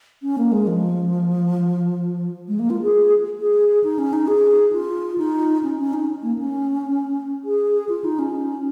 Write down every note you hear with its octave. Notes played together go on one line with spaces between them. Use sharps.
C#4
A#3
G#3
F3
G#3
A#3
F4
G#4
G#4
D#4
C#4
D#4
G#4
F4
D#4
C#4
C#4
D#4
A#3
C#4
G#4
F4
D#4
C#4